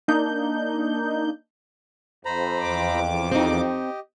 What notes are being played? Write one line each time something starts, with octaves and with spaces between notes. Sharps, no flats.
A#3 D4 D#4 G6
F2 C5 A#5 B5
E2 D6
C4 D#4 G4 D#5